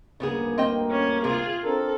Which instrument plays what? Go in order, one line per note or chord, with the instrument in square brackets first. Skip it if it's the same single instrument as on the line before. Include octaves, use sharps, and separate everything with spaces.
[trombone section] D2 G2 A#3 [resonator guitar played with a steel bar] C#3 B3 G#4
[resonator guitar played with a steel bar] C4 D#5 G5
[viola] C#4
[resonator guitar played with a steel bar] C3 [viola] F4 G#4
[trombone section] C4 D4 A#4 [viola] A4